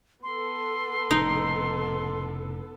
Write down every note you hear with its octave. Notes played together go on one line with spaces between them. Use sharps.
B3 A4 C6
F1 A2 C#3 D#4